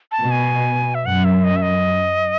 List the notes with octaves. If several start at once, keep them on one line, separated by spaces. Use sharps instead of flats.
A5
B2
G#5
E5
F#2 F#5
E5
D#5
E5
D#5